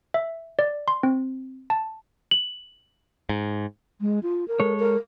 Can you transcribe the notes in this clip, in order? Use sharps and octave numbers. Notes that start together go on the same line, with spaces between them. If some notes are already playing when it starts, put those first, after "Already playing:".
E5
D5
C6
C4
A5
F#7
G#2
G#3
F4
A#4
G#3 A4 C#5
A#4